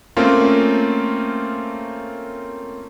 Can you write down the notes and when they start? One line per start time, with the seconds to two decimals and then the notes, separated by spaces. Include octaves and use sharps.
0.16 A3 A#3 C4 C#4 F4 A#4